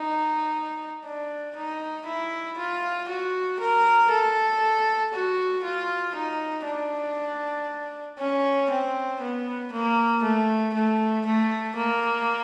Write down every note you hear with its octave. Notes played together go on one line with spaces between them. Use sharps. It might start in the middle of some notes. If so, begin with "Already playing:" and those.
Already playing: D#4
D4
D#4
E4
F4
F#4
A#4
A4
F#4
F4
D#4
D4
C#4
C4
B3
A#3
A3
A3
A3
A#3